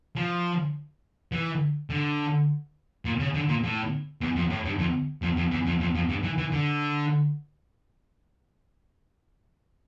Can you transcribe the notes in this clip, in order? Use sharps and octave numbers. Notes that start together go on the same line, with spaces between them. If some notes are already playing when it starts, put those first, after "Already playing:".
F3
E3
D3
A#2
C#3
D3
A#2
A2
E2
F2
A2
G2
F2
F2
F2
E2
F2
F2
F2
G2
E3
E3
D3